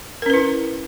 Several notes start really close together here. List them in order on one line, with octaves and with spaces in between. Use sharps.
A#4 C#4 B4 E4